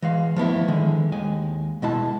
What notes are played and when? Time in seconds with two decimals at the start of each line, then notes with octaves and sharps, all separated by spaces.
0.02 E3 G#3 F5
0.36 F3 A3 B3 E4
0.68 D3 D#3 G#3
1.12 D#2 G#3 G#5
1.82 B2 G#3 E4 A5